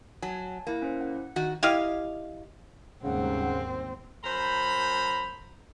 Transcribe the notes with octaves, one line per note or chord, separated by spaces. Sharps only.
F#3 G#5 A5
A#3 E4 A#4
C#4 E4 C5
F#5
D#3 F#4
E4 G4 D#5 F5
D#2 G#2 C#3 G3 C4 F#5
F#2 C5 A#5 B5